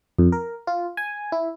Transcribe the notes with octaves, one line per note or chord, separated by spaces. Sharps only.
F2
A#4
F4
G#5
E4